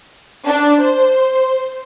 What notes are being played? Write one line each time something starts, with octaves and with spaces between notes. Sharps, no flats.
D4
C5